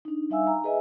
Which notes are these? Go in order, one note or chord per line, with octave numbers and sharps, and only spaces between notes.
D4 D#4
G3 D#4 E5 F5 G#5 E6
A#5
G#4 B4 D#5 E5 G#5